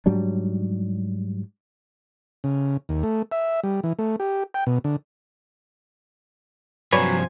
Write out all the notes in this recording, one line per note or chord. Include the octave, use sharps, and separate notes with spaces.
G#2 F#3 G3 D4
C#3
D#2
A3
E5
G3
E3
A3
G4
G5
B2
D3
G2 C3 F3 F#3 B4 C#5 D5 G#5